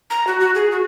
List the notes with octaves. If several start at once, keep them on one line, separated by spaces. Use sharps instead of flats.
A#5
F#4
F#4
G#4
F#4